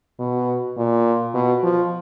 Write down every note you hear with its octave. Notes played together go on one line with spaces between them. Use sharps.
B2
A#2
B2
F3